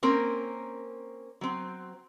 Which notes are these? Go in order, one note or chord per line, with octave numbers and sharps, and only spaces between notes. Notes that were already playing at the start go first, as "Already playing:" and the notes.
A#3 C4 C#4 A#4
F#3 C4